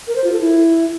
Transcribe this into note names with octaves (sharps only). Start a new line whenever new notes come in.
A#4
C5
F4
A4
E4